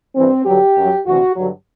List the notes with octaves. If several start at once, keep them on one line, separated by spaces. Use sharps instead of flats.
G2 E3 C4
G2 D3 F#3 G4
F#2 F#3
D2 C3 E3 F#4
G2 D3 F#3